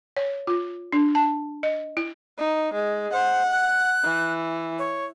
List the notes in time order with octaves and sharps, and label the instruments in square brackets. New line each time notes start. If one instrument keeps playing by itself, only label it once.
[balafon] C#5
F4
D4
A5
D#5
E4
[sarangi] D#4
G#3
[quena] C5 [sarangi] F#5
[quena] F#6
[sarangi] E3
[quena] C#5